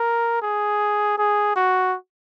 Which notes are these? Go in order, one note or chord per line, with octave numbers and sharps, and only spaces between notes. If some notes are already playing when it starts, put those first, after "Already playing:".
Already playing: A#4
G#4
G#4
F#4